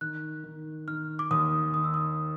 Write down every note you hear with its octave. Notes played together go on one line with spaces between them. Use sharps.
D#3 F#6
D#3
D#3 F6
D6
D#2 D#6
D#3 D#6
E6
D#6